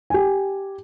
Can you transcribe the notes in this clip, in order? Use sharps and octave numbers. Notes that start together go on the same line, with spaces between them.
G4 G#5